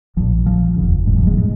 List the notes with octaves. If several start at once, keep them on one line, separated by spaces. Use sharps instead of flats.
A#1 A#2 F3
F3
F1 D#2 C#3
G#2 G#3
F3
G#2 G#3
C#3 G#3